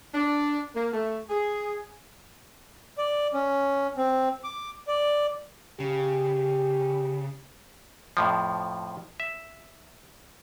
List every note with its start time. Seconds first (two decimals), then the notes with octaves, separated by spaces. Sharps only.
0.14 D4
0.76 A#3
0.94 A3
1.30 G#4
2.98 D5
3.34 C#4
3.97 C4
4.44 D6
4.87 D5
5.80 C#3 G4
8.17 F2 A2 F3
9.20 E5